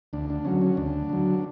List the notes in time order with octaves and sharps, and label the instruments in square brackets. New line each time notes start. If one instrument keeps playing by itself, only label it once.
[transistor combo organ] D2 D4
D4
D3 F#3 C#4
C#4
D2 D4
D3 F#3